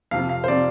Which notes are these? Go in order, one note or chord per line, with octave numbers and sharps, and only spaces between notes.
F2 C3 F3 F5
F5
C5
C3 F3 D5